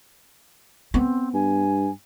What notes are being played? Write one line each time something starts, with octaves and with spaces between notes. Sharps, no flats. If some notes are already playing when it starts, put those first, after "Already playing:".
B3 C4
G2 G#5